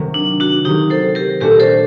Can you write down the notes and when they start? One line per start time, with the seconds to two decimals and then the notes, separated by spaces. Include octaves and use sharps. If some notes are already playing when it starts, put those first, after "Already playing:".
Already playing: C3 D#3 F#3
0.14 D4
0.40 D4 F#4
0.65 C3 D#3 F#3 D#4 G4
0.90 A4 C5
1.15 G4 A#4
1.40 A#2 A3 D4 F#4 G4 A#4
1.60 A4 C5